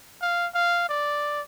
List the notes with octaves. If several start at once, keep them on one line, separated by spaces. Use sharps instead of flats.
F5
F5
D5